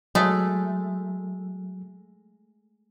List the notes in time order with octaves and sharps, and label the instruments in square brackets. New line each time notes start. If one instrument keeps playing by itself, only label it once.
[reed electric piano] F#3 [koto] G#3 A3